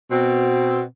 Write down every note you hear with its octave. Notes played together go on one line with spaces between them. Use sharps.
B2 C4